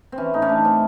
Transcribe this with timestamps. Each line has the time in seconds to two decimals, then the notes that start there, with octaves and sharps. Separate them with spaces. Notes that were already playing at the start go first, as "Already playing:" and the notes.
0.12 C4
0.18 E3 C#4
0.33 A2 D#4
0.42 C#4
0.49 A3 D4
0.65 C4 C#4